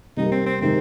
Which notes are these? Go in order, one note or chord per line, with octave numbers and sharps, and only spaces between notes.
C3 G3 A#3 D#4
C4
C4
C3 D#3 G#3 C4